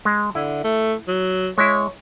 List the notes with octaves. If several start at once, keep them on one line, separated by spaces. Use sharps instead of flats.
G#3
D3 E4
A3
F#3
G#3 E4 C#5